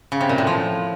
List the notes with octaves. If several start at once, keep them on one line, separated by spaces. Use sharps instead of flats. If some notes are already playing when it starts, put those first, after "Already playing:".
C#3
C3
A#2
A2
F3